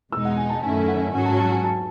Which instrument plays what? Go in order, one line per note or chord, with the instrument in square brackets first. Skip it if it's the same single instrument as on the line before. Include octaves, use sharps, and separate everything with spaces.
[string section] E2 B2 G#3 D#4 [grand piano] E6
[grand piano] F#5
G#5
A5
[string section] F#2 D#3 A3 C#4 E4 [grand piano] G#5
[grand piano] G#5
F#5
G#5
[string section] G#2 F#3 C#4 F#4 [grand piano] G#5
[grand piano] A5
A5
G#5
A5